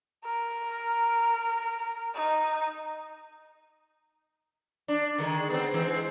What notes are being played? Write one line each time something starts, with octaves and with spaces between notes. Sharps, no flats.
A#4
D#4
D4
D3 D#3 G#3
B3 C4
E3 G#3 C4